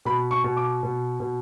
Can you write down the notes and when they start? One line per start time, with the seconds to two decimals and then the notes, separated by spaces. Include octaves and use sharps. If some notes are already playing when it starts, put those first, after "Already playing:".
0.05 B2 B5
0.31 C#6
0.44 B2
0.57 D6
0.83 B2
1.20 B2